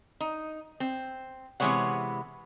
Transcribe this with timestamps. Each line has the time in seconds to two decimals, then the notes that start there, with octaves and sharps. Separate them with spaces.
0.20 D#4
0.80 C4
1.60 C3 E3 G#3 B3 C#5 F#5